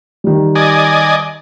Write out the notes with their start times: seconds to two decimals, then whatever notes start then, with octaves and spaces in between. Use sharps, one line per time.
0.24 D#3 G3
0.55 D5 D#5 G#5